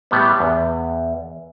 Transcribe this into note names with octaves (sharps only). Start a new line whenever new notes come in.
A2 G3 B3
E2